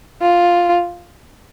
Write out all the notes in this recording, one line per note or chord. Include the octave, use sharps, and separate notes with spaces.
F4